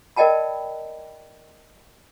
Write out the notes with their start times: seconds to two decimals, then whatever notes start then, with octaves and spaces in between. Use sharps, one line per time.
0.16 A#4 D5 D#5 G5 A5 B5